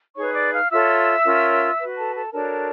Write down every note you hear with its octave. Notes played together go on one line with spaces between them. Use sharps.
D#4 G#4 B4 C#5 C#6
D5 D6
F5 F6
F4 A4 C#5 E5 E6
C#4 F4 A#4 C#5
F#4 B4
A4 A5
A4 A5
D4 F#4 A4 A#4 C#5 A5